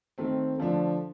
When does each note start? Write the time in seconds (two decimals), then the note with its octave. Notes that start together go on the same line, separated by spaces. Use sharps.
0.18 D#3 A3 C4
0.58 D3 F3 A3 D4